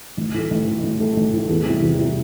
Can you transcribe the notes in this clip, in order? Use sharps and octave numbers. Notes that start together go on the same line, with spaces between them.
A1
A2 A3
A1
A2 A3
A1
A2 A3
A1
A2 A3
E2
C3 G3 E4
E2
C3 G3 E4